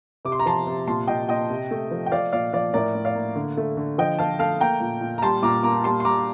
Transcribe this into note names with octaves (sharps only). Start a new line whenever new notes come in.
C3 D6
C6
A#5
F3 A5 C6
C3
A#2 A5 C6
A#2 D#5 G5
A#2 D#5 G5
C3
A3
F3
G5
F3 D5 F5
A#2 D5 F5
F3 D5 F5
A2 A#4 D5
A2
D5 F5
A#3
D3
A3
D3
F3 D#5 G5
F3 F5 A5
A3 F5 A5
A#3 G5 A#5
A#2
A#2
A#5
G3 A5 C6
A#2 A#5 D6
A#3 A#5 D6
G3 A5 C6
C6
G3 A#5 D6